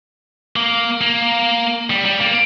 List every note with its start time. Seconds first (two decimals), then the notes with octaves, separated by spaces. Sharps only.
0.56 A#3
1.01 A#3
1.90 G3
2.06 G3
2.21 A#3